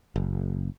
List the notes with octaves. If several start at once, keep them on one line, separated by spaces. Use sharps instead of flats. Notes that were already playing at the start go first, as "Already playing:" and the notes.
F#1